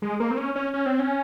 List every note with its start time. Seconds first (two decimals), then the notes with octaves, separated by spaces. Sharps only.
0.02 G#3
0.20 A#3
0.31 C4
0.37 C#4
0.56 C#4
0.74 C#4
0.86 C4
1.00 C#4